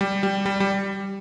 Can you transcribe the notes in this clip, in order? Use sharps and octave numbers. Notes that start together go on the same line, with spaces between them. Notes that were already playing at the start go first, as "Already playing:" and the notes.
G3
G3
G3
G3